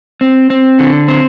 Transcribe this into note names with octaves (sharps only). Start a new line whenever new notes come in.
C4
C4
D3
C4